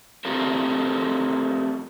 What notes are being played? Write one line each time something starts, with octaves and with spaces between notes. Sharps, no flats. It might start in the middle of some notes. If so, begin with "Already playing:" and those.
A3 C4 F4 G4 A4 A#4